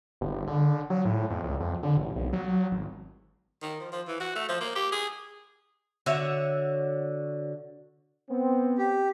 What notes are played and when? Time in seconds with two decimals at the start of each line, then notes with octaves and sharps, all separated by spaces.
0.21 G1
0.47 D3
0.90 F#3
1.05 A2
1.30 F2
1.44 C#2
1.60 F2
1.83 D3
1.97 A1
2.16 B1
2.33 F#3
2.72 G#1
3.62 D#3
3.80 F3
3.92 F3
4.07 E3
4.20 F#4
4.36 A3
4.49 F3
4.61 A#3
4.75 G4
4.92 G#4
6.06 D3 F#4 C#5 E5
8.30 B3 C4
8.78 G4